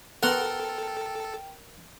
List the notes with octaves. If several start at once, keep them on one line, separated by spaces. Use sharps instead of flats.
B3 A4 A#4 F#5 G5 A#5 C6